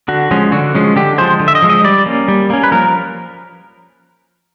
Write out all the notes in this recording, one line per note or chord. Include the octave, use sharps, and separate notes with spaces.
D3 F#4
F3 G#3 C#4
D3 F#4
F3 G#3 C#4
D3 G4
F3 G#3 C5
D3
E5
D#5
F3 G#3
D#5
G3 D5
A#3 C#4
G3
A#3 C#4
B4
F3 A#4